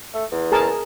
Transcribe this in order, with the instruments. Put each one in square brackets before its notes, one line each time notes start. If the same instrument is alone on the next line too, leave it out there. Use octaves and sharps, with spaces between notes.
[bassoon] A3
E2
[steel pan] G#4 A#4 A5